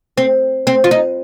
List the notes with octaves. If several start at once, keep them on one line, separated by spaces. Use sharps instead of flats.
C4
C4
F4
D#4